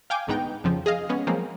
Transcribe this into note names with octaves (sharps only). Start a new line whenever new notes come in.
F5 G5 G#5 D6
A1 D2 G#2 B3 D#4 G5
F2 C#3 F3
G#4 D#5 F5
G#3 B3 C#4
F3 F#3 G#3 A#3 C4